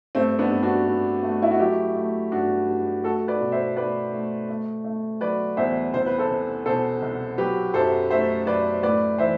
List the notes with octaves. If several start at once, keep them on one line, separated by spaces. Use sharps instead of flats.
G2 A3 C4
B3 D4
G2
D4 F#4
G2
A3
E4
F#4
F#3 E4 G4
A3
G2 D4 F#4
G2
A3 F#4 A4
B4 D5
B2
C5 E5
A3 B4 D5
A3
A3
A3
F#3 B4 D5
E2 C5 E5
C2 C5
B4
A4 C5
C2
B2 A4 C5
C2
F#3 G4 B4
F#2 A4 C5
A3 C5 E5
F#2 B4 D5
A2 B4 D5
E3 C5 E5